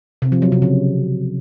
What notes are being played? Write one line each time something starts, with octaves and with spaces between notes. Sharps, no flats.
C3
F3
F#3
C3
C#3